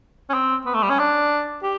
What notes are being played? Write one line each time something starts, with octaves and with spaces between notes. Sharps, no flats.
C#4
C4
B3
A3
G3
C#4
D4
G4